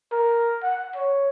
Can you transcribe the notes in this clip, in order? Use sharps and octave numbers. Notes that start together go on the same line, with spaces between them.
A#4
F#5
C#5